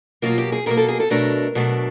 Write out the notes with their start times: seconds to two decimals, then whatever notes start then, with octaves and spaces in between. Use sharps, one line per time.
0.22 B2 F#3 A#3 F4
0.38 G4
0.52 G#4
0.66 B2 F#3 A#3 A#4
0.77 A4
0.88 G#4
1.00 A4
1.10 B2 F#3 A3 D4 A#4
1.55 B2 F#3 A3 D4